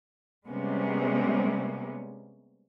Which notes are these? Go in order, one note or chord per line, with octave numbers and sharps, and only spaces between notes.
C3 G3 G#3 A#3 B3 C#4